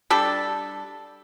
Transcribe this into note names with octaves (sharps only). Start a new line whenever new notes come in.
G3 D4 A4